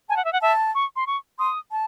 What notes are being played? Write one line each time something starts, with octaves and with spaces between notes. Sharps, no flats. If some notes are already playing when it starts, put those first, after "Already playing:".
G#5 A5
F#5
E5
F#5
E5 A5
C#6
C6
C#6
C6 D#6
A5